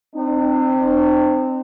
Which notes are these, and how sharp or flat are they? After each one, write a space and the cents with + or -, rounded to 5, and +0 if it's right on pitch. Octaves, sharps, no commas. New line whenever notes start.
C4 +0 D#4 -45